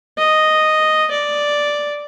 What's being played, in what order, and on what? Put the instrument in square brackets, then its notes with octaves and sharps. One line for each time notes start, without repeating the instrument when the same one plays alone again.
[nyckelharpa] D#5
D5